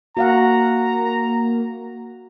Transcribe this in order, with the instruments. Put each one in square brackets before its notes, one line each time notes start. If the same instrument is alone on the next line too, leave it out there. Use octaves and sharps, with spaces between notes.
[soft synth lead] A#3 [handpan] F#4 F5 F#5 [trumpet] A#5